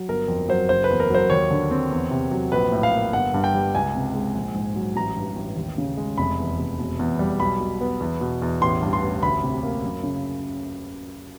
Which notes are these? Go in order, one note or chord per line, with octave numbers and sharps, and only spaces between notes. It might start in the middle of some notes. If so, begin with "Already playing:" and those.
Already playing: F#3
G1 A#4
F2
F#3 C5
F#1 C5
B4
E2
A#4
F#3 C5
D#2 C#5
D3
C4
E2
C3
F#3
A#1 B4
A2
F5
A#3
G1 F#5
G2
G5
G3
C#2 G#5
C3
G#3
A#1
G#2
F#3
A1 A#5
G2
A1
D#2
C#3
G#3
F1 B5
E2
F1
E1
E2
G3
B1 B5
B2
B3
E2
B2
E2
A1 C6
G2
C6
A1
D2 B5
C3
A#3
F#2
C#3